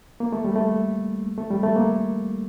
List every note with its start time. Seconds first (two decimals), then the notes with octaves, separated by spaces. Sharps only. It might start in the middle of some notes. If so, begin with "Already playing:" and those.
0.20 A#3
0.33 A3
0.45 G3
0.56 A3
1.38 A3
1.50 G3
1.63 A3
1.76 A#3